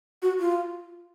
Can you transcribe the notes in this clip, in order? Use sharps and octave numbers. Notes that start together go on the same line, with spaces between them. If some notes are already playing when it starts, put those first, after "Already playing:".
F#4
F4